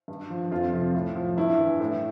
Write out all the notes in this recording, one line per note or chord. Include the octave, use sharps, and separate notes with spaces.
G2
F3
F2 F4
C3 F3
A2
F3
G2 E4
E3
A2